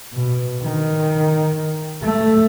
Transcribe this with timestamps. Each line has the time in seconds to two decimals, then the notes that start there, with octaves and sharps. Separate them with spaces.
0.13 B2
0.62 D#3
2.03 A3